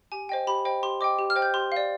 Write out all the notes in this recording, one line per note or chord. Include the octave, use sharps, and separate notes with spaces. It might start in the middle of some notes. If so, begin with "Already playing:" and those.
G4 G#5
C5 D#5 G5
G4 B5
C5 D#5 G5
G4 C6
C5 D#5 G5 D6
G4
F6
C5 D#5 G5
G6
G4 C6
D5 F5